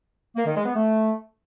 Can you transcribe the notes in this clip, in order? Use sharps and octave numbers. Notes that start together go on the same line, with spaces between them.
A#3
D#3
G#3
B3
A3